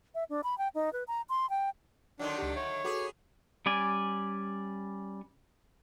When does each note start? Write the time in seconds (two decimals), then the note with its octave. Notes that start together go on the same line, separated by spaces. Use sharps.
0.15 E5
0.30 D4
0.44 B5
0.58 G5
0.75 D#4
0.93 B4
1.08 A#5
1.29 C6
1.50 G5
2.19 D3 D#3 F#3 D4
2.38 C#2 G4
2.56 C#5 E5
2.84 B3 F#4 G#4 A4 D6
3.66 G3 C#4 D5 G#5